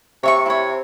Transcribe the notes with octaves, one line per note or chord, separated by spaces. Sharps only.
C3 C#5 E5 C#6
E4 C#5